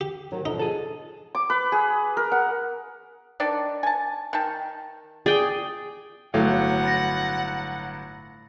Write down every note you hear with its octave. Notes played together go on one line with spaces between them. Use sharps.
G4
D#3 F#3
B2 D3 F3 D#4
G#4 A4
D6
B4
G#4
A#4
F#5
D#3 D4 D5
G#5 A5
D#3 G5 A5
G#4 D5 G5
G1 A2 F#3 F5 F#5
B5 A6 A#6